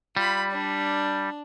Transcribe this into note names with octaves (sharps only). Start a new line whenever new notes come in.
G3 F4 B5
D4